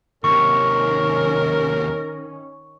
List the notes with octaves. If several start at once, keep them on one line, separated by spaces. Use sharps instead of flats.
D#2 C3 D#3 C#4 A#4 C#6